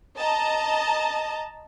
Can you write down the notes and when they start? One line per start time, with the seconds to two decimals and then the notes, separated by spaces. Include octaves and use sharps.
0.17 D#5 A5 A#5